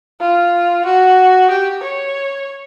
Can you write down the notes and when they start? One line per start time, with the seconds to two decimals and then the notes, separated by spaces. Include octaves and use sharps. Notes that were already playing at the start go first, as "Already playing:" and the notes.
0.20 F4
0.85 F#4
1.50 G4
1.82 C#5